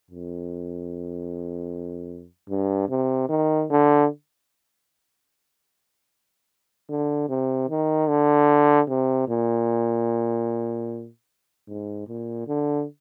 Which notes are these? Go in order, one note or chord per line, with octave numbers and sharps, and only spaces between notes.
F2
G2
C3
D#3
D3
D3
C3
D#3
D3
C3
A#2
G#2
A#2
D3